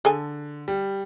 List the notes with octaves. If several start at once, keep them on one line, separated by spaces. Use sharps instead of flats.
D3 G#4 A4 G#5
G3